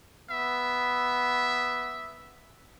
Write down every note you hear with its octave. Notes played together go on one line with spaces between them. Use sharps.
B3 E5